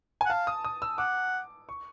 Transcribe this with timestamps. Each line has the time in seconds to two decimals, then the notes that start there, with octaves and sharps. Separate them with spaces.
0.21 G#5
0.26 F#5
0.29 F5 A5
0.47 D#6
0.64 D#6
0.82 E6
0.98 F#5 D6
1.69 C#6